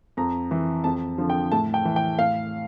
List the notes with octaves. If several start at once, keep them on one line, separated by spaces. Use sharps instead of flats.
F2 A#5
E3
F2 A5
D3 F3
G5
A2 A5
G5
E3
G5
A2 F5